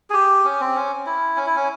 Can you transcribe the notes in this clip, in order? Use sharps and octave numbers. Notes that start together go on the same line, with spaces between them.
G#4
G4
C#4
C4
C#4
E4
C#4
E4
C#4